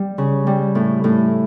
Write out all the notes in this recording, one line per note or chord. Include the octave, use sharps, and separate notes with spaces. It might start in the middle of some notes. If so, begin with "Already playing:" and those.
Already playing: G3
C#3
G3
A2
A2